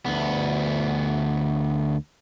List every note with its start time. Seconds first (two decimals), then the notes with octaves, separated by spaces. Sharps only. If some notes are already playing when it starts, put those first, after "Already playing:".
0.06 D2 B3